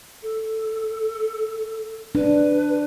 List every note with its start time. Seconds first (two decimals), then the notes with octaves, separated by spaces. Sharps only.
0.23 A4
2.15 D4 B4